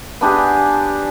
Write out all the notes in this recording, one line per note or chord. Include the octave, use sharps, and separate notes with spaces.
B3 D4 G4 G#4